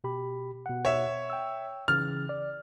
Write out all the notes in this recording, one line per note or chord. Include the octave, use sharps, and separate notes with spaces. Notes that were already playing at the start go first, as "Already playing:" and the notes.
B2 G4 B5
B2 F#5
C#5 E5
G5 E6
C#3 E3 F6 A6
D5